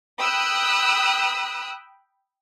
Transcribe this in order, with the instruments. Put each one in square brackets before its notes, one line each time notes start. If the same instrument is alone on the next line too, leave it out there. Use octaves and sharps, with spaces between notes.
[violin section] G5 B5 D#6 E6 F#6